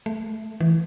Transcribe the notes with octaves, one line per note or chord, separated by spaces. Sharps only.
A3
E3